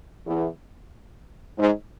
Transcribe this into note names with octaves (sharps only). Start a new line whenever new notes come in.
E2
G#2